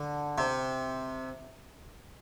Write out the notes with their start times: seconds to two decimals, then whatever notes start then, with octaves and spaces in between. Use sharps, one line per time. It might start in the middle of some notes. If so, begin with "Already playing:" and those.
Already playing: D3
0.38 C3